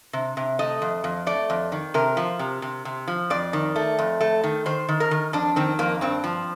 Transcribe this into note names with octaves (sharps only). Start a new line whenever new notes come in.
C3
C3
A3 D#5
F2
F2
A3 D5
F2
D#3
C3 A#4
F3
C3
C3
C3
F3
F2 D5
D#3
A3
F2
A3
D#3
D#3 C5
D#3
A#4
D#3
F2 D4
D#3 C4
F2 A#3
G2 C4
F3